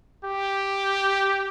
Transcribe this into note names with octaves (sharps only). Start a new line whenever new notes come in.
G4